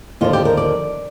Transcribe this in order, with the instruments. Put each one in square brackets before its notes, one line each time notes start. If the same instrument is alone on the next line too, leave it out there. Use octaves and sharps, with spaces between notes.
[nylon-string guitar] D#2 D3 F3 F4
G4
A#4
D5